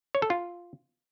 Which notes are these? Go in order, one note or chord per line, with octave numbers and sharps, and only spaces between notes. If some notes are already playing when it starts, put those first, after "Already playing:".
C#5
A4
F4